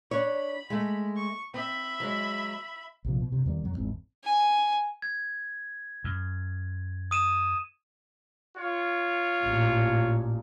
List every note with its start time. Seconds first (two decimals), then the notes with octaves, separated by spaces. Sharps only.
0.11 D4 C#5 B5
0.70 G#3 A3
1.16 C#6
1.54 C4 E5 B5
2.00 F#3 G#3
3.04 A#1 C3 F3
3.20 B2
3.32 G2 C3
3.46 E2 D#3 G3
3.64 F2 F#3
3.77 G#1 E2 G#2 C4
4.24 G#5
5.02 G#6
6.04 F#2
7.11 D#6 D#7 E7
8.56 F4 C#5
9.43 A1 A#2